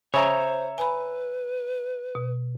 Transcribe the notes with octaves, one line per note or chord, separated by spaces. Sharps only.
C#3 C5 C#5 E5 A#5
B4 G#5 B5
B2